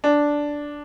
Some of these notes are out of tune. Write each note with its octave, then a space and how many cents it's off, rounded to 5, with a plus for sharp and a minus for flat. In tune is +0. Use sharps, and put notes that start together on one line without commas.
D4 -5